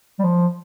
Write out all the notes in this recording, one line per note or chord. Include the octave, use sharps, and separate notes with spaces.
G3
F3